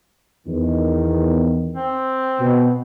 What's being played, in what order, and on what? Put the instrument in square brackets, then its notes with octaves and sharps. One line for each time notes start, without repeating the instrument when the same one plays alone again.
[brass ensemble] E2 D#3
[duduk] C4
[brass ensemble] B2